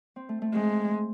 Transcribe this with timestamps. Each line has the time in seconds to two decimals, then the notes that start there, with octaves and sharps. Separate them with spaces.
0.16 C4
0.29 A3
0.42 A3
0.54 G#3 C4